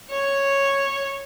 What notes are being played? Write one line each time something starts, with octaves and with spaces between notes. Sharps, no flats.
C#5